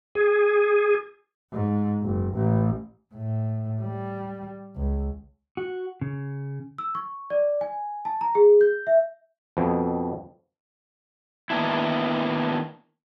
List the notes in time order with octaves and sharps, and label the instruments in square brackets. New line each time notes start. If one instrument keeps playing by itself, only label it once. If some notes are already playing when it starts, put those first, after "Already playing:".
[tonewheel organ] G#4
[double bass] G#2
F#1
A1
A2
G3
C#2
[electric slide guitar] F#4
C#3
[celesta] E6
C#6
D5
G#5
A5
A#5
G#4
G6
E5
[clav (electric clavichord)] F2 B2
[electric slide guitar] D#3 A#3 B3 D4 E4